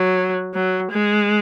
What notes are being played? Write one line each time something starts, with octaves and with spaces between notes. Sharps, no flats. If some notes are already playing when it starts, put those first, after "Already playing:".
Already playing: F#3
F#3
G#3